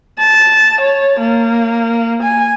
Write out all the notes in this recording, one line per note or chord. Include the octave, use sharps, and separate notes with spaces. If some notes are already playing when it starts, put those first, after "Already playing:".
A5
C#5
A#3
G#5